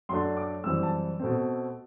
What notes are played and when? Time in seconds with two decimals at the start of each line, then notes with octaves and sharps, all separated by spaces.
0.09 F#2 F#3 A3 D4 C6
0.37 D6
0.64 F#2 E3 G3 C4 E6
0.83 A5
1.19 B2 A3 C4